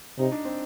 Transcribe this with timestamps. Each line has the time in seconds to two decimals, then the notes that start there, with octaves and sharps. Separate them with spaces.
0.18 C3 D#4
0.32 D4
0.45 C4